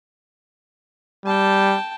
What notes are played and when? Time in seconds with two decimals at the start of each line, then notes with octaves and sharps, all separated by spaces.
1.25 G3 G5 A5